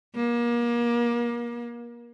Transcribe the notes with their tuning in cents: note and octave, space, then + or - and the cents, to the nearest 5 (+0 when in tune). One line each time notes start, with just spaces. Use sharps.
A#3 +30